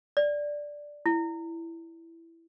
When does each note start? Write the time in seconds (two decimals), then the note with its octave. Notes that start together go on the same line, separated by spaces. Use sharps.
0.17 D5
1.06 E4